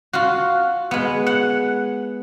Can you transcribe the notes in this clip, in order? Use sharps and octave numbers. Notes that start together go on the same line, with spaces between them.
F4 F#4
G#3 B3
F#5